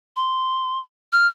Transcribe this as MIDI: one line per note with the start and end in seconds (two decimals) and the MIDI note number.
0.16 0.79 84
1.13 1.27 89